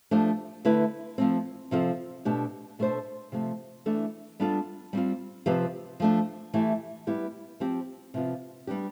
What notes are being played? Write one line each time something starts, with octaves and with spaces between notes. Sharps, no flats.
F3 A3 D4 G4 C5
D3 A3 E4 B4
F3 A3 C4
C3 F3 C4 F4 A4
B2 A3 D4 G4
B2 A3 D4 A4 C5
C3 F3 A3
E3 A3 D4 A4
G3 B3 D4 F4 A4
G3 C4 F4
C3 F3 C4 G4 B4
F3 A3 D4
E3 A3 E4 G4
G3 B3 E4 G4
F3 C4 G4
C3 F3 B3 F4
G3 B3 D4 G4